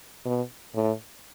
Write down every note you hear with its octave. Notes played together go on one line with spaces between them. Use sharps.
B2
A2